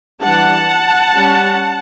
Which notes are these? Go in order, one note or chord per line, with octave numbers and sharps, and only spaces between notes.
E3 G3 D4 F#5 A5
G3 C#4